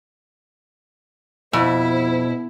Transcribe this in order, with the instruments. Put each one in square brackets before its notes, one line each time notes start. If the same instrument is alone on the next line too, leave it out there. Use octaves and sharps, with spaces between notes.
[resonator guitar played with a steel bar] F2 [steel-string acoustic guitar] B2 [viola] E4 [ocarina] C5